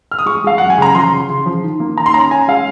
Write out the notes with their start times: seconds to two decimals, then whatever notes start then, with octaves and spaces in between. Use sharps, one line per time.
0.12 F6
0.19 D#6
0.26 G#3 C#6
0.44 G#3 F5
0.58 F#2 F#5
0.70 G#5
0.78 C#3 A#5
0.94 F3 C6
1.12 C#3
1.29 C#3
1.46 F3
1.63 D#3
1.80 A#3
1.97 D#3 A#5
2.06 C6
2.14 C#4 A#5
2.31 C#4 G#5
2.48 G#3 F5